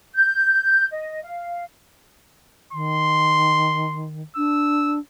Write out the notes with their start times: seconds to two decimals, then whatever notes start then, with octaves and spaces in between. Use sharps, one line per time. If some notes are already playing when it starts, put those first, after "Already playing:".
0.14 G6
0.91 D#5
1.23 F5
2.73 D#3 C6
4.36 D4 E6